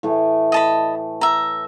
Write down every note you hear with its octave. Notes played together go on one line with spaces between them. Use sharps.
A2 E3 A3
D#5 A5 B5
E5 A#5